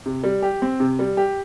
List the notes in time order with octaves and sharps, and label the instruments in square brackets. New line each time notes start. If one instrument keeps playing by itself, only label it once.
[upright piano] C3
G3
G4
C4
C3
G3
G4